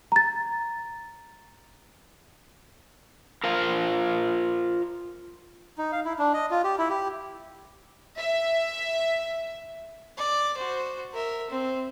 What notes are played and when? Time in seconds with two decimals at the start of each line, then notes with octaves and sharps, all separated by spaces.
0.12 A#5 A6
3.44 F4 A#4 C5 F5
5.78 D#4
5.92 F5
6.05 E4
6.18 D4
6.33 D#5
6.51 F4
6.64 G4
6.78 E4
6.90 G4
8.19 E5
10.18 D5
10.57 F#4 C5
11.14 A#4 E5
11.50 C4